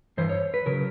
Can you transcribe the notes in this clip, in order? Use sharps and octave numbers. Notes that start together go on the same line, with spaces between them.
G2 E3 C5
C#5
B4
C#3 F#3 A#4